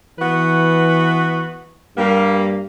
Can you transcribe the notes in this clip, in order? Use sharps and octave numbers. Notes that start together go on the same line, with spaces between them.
E3 B3 F#4 B4
G2 G3 A#3